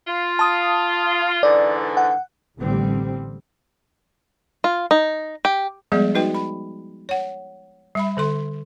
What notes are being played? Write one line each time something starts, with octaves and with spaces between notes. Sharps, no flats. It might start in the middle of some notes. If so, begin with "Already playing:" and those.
F4
A5 D#6
G#2 D3 E3 D5
F#5
A1 A2 D3 G3 C4
F4
D#4
G4
F3 G3 G#3 B3 G#4 D5
D#4 F#4 B4 D#5 G5
B5
C#5 F#5
G3 E5 B5
D3 A4 C6